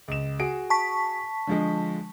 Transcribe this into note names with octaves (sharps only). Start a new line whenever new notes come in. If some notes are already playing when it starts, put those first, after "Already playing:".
C#2 E7
F#4 G#4 D7
A5 C#6 B6
D3 F3 G#3